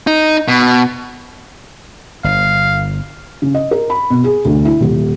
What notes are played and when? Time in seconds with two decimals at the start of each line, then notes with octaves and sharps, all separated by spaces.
0.07 D#4
0.48 B2
2.24 G1 F5
3.42 C#3
3.54 D#5
3.71 A#4
3.90 B5
4.10 B2
4.24 G#4
4.45 D2
4.65 E4
4.81 D#1